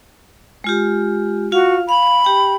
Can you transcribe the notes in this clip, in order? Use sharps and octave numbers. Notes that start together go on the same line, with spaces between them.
G#3 F4 G4
F4 F#4 F5
F5 B5
G4 G5